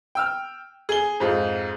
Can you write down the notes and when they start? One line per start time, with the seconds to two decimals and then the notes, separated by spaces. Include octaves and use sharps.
0.15 G5 E6 F6
0.89 G#4 G7
1.20 F2 G#2 F4